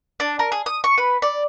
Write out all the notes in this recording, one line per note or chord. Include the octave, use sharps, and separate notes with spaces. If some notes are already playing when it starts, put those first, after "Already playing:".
D4
A#4
G#4
D#6
C#6
B4
D5